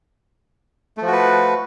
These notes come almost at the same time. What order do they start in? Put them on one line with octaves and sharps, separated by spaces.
A3 F3 F#4 B4